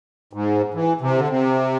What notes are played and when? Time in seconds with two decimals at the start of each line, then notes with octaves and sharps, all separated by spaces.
0.33 G#2
0.74 E3
1.01 C3
1.17 D3
1.28 C3